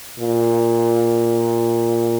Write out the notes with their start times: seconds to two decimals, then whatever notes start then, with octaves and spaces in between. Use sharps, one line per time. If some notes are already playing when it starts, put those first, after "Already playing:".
0.19 A#2